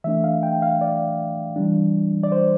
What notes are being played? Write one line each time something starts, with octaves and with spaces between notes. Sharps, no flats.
E3 A3 D4 E5
F5
G5
F5
D5
E3 G3 D4
D5
C5